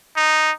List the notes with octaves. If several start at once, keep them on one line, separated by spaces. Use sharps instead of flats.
D#4